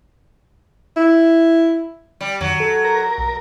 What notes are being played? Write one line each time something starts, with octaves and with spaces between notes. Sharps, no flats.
E4
G3
F2 D#3 F#3
A4
A#4
B1